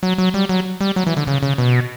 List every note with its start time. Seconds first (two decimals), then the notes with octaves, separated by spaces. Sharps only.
0.03 F#3
0.18 F#3
0.34 G3
0.49 F#3
0.81 G3
0.96 F#3
1.07 E3
1.17 D3
1.27 C#3
1.43 C#3
1.58 B2